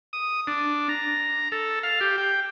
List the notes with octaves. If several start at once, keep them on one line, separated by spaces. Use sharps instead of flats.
D#6
D4
A#5
A4
F5
G4
G5